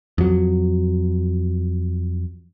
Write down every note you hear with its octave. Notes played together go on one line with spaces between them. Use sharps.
F2 F#3